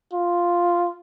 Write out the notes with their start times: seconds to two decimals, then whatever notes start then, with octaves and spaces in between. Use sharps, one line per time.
0.13 F4